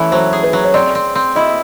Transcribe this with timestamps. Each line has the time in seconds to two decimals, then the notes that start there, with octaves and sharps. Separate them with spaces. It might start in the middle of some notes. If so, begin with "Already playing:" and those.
Already playing: E3 A3 C#4
0.12 F#3 C5
0.33 G#4
0.43 B4
0.53 F#3
0.65 C#5
0.74 C4 D5
0.95 C4
1.15 C4
1.36 E4 D#5